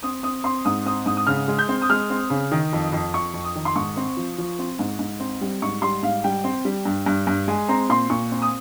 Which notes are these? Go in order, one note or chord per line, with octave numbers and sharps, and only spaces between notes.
C4 D#6
C4 D#6
C4 C6
G#2 D#6
C4 D#6
G#2 D#6
D#6
C#3 F6
G#3
G6
C4
D#6
G#3 F6
C4
C#3
D#3
F2
F2
F2 C#6
F2
D#6
D#3
C6
G#2 C#6
C4
F3
F3
C4
G#2
G#2
C4
G3
G#2 C#6
G3 C6
G#2 F5
G3 G5
C4
G3
G2
G2
G2
G#3 G#5
C4 A#5
A#2 C6
A#2 C#6
C4
D#6